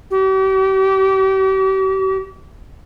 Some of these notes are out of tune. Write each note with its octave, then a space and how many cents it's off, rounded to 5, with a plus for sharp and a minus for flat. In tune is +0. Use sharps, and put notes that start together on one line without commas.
G4 -40